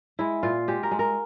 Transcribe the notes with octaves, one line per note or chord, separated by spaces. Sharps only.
G#3 E4
A#2 F4
G#3 G4
A#4
G#3
A#4